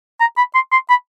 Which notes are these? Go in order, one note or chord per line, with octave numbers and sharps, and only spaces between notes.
A#5
B5
C6
C6
B5